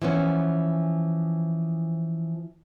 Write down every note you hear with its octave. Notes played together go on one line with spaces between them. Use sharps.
E3 F3 B3 C#4